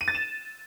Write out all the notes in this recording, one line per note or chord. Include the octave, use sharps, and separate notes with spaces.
D#7
A6
E7